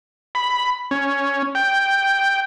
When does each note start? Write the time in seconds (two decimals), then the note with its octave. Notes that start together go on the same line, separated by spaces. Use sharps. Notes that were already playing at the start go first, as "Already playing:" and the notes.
0.35 B5
0.91 C#4
1.55 G5